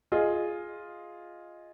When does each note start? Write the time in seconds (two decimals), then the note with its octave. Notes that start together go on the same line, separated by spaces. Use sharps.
0.12 F4 G#4 D#5